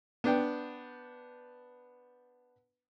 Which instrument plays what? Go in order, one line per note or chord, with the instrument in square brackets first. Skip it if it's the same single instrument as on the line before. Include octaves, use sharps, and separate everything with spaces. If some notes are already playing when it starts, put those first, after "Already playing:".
[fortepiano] B3 D4 G5